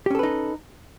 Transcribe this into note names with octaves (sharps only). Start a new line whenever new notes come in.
C#4 D#4 G4 A4 B4